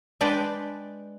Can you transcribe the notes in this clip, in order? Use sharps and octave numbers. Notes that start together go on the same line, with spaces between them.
G#3 D4 B4 D5 G5